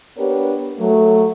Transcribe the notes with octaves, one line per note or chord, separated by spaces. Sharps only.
B3 D4 G4 A#4 B4 C#5
F#3 A3